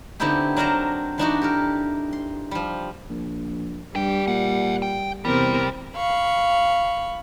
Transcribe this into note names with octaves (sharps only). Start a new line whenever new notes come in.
D3 B3 C4 D#4 E4 G4
F#3 D4 A#4 C5 D#5 A#5
E3 D4 D#4 F#4
G4 A4 A#4
C6
F3 G3
A#1
G2 G3 G#4 G5
A#2 E5 F#5
G5
E2 C3 G3 C4 A#4
F5 B5 C#6